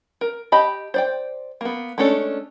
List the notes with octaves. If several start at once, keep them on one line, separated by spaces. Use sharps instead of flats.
A#4
G4 D#5 A5 B5
C5 D5 G5
A#3 B3
G#3 A3 C#4 D4 A4